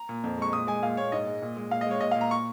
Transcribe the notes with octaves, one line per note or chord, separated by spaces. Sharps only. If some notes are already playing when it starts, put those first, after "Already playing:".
Already playing: A#5
A#2
F2
G#3 C#6
A#2 D#6
G#3 G#5
A#2 F5
A#2 C#5
G#2 D#5
G#3
A#2
G#3
A#2 F5
D#5
G#3 C#5
A#2 D#5
A#2 F5
A#5
C#6